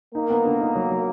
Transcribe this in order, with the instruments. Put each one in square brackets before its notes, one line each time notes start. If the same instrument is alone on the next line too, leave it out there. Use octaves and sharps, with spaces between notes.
[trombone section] A#3 [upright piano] D#4
[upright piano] B3
D3
D#4
F#3
F#3